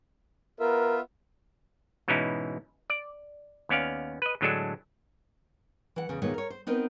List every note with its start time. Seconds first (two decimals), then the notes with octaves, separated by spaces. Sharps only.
0.60 B3 F4 A#4 E5
2.08 G#2 B2 E3 C#4 D#4 E4
2.90 D5
3.69 D#2 B3 C#4 D5 F5
4.22 B4 D#5
4.41 A2 D3 F#3 G#3 D4 A4
5.96 E3 F#5
6.09 E2 C#3
6.22 D#2 A#2 D#3 G#3 B3 C#5
6.34 A#4 C#5
6.50 C5
6.67 B3 C4 D#4 A#4 B4